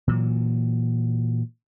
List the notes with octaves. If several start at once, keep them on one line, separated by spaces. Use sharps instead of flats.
A#2 E3 F#3